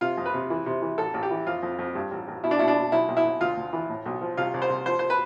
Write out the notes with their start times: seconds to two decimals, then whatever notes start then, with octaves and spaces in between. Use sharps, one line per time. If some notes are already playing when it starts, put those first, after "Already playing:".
0.01 C3 F4
0.17 F2
0.25 B4
0.34 C3
0.50 E3
0.66 C3
0.82 E3
0.98 A1 A4
1.14 A1
1.23 G4
1.31 E3
1.47 F2 F4
1.63 F2
1.79 F2
1.95 G2
2.11 A1
2.28 A1
2.44 B2 E4
2.51 D4
2.59 B2 E4
2.68 D4
2.76 B2
2.92 B1 E4
3.08 B1
3.17 E4
3.25 B1
3.41 D2 F4
3.57 D2
3.73 E3
3.90 A2
4.06 B1
4.21 F3
4.37 C2 F4
4.54 C2
4.62 C5
4.70 C2
4.86 F3 C5
4.99 C5
5.10 B4